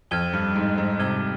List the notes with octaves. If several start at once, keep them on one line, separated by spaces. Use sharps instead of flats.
F2 F6 G#6 D#7 G7
G2
G#2
G#2
C3 F6 G#6 D#7 G7